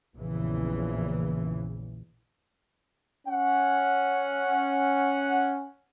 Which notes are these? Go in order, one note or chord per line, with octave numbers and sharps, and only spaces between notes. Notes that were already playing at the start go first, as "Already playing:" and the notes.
A#1 E2 A#2 C#3 E3
C#4 F#5